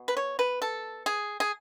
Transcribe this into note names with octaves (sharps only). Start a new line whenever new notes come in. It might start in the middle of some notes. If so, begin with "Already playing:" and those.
Already playing: B2
B4
C#5
B4
A4
G#4
G#4